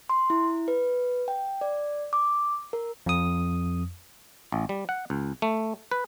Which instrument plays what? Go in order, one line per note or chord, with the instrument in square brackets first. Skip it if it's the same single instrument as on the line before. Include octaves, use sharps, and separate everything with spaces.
[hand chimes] C6
E4
B4
G5
D5
D6
A#4
[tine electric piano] F2 D#6
[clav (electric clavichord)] A1
G3
F#5
C#2
A3
B4